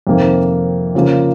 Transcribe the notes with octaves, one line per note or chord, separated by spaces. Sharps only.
F2 C3 D#3 A#3
C#3 F3 A#3